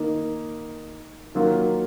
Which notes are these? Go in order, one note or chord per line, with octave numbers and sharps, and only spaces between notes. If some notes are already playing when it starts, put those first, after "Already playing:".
Already playing: D#3 A#3 D#4
D#3 F#3 A#3 F4